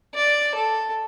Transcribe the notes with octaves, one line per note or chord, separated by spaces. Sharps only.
D5
A4